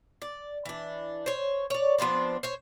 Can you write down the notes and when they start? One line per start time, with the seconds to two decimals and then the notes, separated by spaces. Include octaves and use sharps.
0.22 D5
0.65 E3 D4
1.26 C5 C#5
1.70 C#5 D5
1.98 F3 B3 C4 D4
2.43 C5 C#5